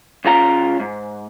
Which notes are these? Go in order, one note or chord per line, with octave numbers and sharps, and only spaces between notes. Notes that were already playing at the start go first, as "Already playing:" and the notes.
C#2 G#3 C#4 F4 A#5
G#2